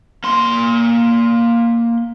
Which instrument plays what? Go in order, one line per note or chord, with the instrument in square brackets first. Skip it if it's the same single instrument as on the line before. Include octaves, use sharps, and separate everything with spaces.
[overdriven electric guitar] A#3 C6